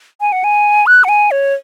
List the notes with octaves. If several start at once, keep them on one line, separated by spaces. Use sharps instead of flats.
G#5
F#5
G#5
F#6
F#5
G#5
C#5